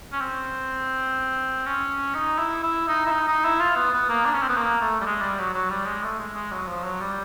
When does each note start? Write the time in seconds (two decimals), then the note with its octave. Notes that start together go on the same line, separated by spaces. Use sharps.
0.12 C#4
0.20 C4
1.66 C#4
2.14 D#4
2.38 E4
2.63 E4
2.88 D#4
3.06 E4
3.12 D#4
3.28 D#4
3.45 E4
3.60 F4
3.76 B3
3.93 B3
4.09 A#3
4.25 D4
4.34 C#4
4.41 C4
4.49 B3
4.57 A#3
4.81 A3
5.01 G3
5.06 G#3
5.21 G3
5.39 F#3
5.54 F#3
5.70 G3
5.86 G#3
6.03 A3
6.19 G#3
6.35 G#3
6.52 F#3
6.68 F3
6.84 F#3
7.01 G3